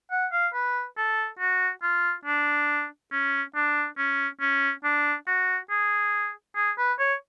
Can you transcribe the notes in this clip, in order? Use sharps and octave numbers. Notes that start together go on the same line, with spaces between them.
F#5
F5
B4
A4
F#4
F4
D4
C#4
D4
C#4
C#4
D4
F#4
G#4
G#4
B4
C#5